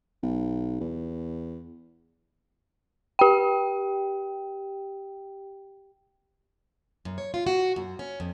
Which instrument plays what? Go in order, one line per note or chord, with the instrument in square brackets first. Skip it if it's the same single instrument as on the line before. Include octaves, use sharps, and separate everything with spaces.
[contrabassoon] B1
E2
[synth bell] G4 G5
[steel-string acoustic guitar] F#2
C#5
F4
F#4
F#2
C#4
F2